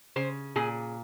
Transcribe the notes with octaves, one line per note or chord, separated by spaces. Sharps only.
C#3 C5
A#2 G#4